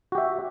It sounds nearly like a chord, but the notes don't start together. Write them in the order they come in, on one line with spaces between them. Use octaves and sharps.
F#4 G4 E5